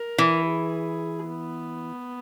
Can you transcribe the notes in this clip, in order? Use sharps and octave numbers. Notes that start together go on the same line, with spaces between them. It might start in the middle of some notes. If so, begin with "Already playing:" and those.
Already playing: A#4
E3
G#4
B3